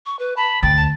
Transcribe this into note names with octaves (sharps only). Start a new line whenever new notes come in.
C#6
B4
A5 B5
D2 G5 A6
A5